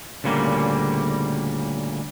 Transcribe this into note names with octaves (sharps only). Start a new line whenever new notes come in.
D2 A#2 C#3 G3 A#3